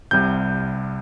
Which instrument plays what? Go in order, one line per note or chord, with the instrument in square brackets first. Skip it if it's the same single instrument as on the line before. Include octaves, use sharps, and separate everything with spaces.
[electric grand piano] C2 C3 G3 G6